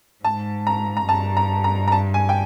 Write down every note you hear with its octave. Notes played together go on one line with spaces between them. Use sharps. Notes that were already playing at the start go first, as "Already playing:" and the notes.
G#2 A5
A#5
A#5
G2 A5
A#5
A#5
A#5
A5
G#5
G5